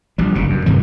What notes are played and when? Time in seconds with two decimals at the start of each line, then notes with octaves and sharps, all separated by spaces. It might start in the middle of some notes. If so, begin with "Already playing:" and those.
0.18 A#1 G3
0.35 F#1 A#2
0.50 F#2
0.66 G2 C3 D#3 G3